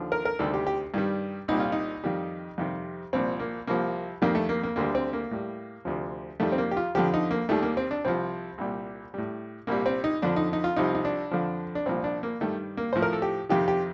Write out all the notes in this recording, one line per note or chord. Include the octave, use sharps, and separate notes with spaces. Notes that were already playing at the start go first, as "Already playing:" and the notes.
Already playing: D#2 D3 F3
A#4
A#4
D2 C3 D#3 G3 A4
G4
G4
G2 D#3 G3
C2 A#2 G3 D#4
F4
D#4
F2 D#3 G3
F2 C3 D#3 G3
C2 A#2 F3 C4
A#3
C2 C3 F3 A#3
F2 D#3 G3 A#3
A3
A#3
A#3
D2 D3 G3 A#3
C4
A#3
A2 G3
D2 C3 F3
F2 D#3 G3 A3
C4
A#3
G4
F4
F2 D3 F3 G4
D#4
A#3
D#2 D#3 G3 A3
A#3
C4
D4
C2 C3 F3 C4
C2 A#2 G3
A2 G3
C2 A#2 G3 A#3
C4
D#4
F2 D3 F3 D4
D#4
D#4
F4
C2 C3 F3 D#4
D#4
D4
F2 D3 F3
D4
C2 A#2 F3 C4
D4
A#3
G2 D#3 G3 A3
A#3
A2 F3 C5
A#4
A4
G4
F2 C3 D#3 G4
G4